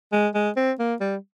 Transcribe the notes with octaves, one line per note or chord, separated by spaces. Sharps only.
G#3
G#3
C4
A#3
G3